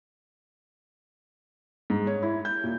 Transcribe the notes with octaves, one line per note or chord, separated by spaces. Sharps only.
G#2
C#5
E4
G6
A#2